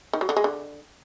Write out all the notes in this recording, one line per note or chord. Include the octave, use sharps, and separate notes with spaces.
D#3
F#3
D3
G#3
D3